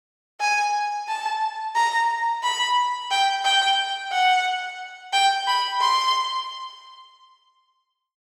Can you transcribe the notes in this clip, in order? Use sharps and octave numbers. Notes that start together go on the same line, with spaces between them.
G#5
A5
A#5
B5
G5
G5
F#5
G5
B5
C6